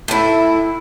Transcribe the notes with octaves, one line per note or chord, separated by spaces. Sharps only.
A2 E4